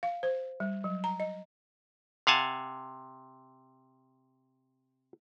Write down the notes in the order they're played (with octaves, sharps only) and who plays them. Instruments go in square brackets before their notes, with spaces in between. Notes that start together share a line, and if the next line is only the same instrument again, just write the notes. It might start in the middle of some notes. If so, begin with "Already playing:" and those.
[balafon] F5
C5
G3
F#3
A#5
D#5
[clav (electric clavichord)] C3 F5 F#5 G#5 A5